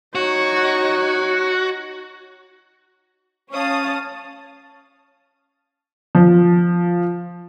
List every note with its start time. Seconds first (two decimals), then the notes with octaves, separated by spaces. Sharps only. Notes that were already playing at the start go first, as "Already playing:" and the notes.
0.15 D#4 F#4 C#5
3.52 C#4 C#5 F5 A5 D#6
6.15 F3